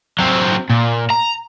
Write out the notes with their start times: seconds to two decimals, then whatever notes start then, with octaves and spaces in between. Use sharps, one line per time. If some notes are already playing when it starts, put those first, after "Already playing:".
0.19 F#3 C4
0.69 A#2
1.10 A#5